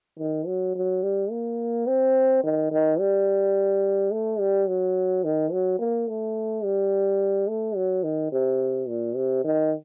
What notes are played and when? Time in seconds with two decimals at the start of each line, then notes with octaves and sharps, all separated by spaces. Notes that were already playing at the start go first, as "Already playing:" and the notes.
0.19 D#3
0.47 F#3
0.75 F#3
1.03 G3
1.31 A#3
1.87 C4
2.44 D#3
2.72 D#3
3.00 G3
4.11 A3
4.40 G3
4.67 F#3
5.24 D#3
5.52 F#3
5.79 A#3
6.08 A3
6.64 G3
7.48 A3
7.76 F#3
8.03 D#3
8.32 C3
8.88 A#2
9.16 C3
9.44 D#3